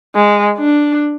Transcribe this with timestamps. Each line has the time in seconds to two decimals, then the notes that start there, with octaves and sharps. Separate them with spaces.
0.15 G#3
0.58 D4